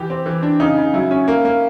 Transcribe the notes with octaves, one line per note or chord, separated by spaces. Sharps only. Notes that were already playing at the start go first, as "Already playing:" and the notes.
Already playing: E3 G4
C4
E3
D4
C#3 D#4
C#3
F#3 E4
C#4
A#3
A#3